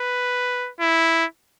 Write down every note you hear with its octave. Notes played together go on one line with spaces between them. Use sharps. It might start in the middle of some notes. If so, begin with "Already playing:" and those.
Already playing: B4
E4